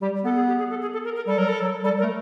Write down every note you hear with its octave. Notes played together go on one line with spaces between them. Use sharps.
G3 G4
B3 A4
G#4
G4
G#4
A4
G#4
A4
A#4
A#4
G3 A4
F#3 A#4
A4
F#3
G3 A4
A#4
A3